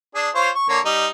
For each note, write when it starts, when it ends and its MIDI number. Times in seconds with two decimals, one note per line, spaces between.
0.15 0.29 62
0.15 0.29 68
0.35 0.50 65
0.35 0.50 72
0.35 0.50 73
0.55 0.67 85
0.69 0.80 50
0.69 0.80 58
0.69 0.80 73
0.85 1.07 55
0.85 1.07 63